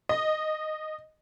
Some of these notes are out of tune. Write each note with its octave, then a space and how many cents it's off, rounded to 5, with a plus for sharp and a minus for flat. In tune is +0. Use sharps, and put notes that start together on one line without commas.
D#5 -5